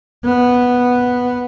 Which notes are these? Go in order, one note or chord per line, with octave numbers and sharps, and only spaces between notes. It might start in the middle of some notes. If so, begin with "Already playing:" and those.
B3